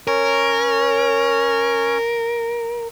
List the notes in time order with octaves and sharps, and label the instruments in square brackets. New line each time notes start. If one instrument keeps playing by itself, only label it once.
[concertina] C#4 C#5 [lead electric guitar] A#4